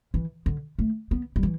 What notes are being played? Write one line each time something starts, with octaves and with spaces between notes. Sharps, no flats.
E3
D3
A3
B3
G3
E3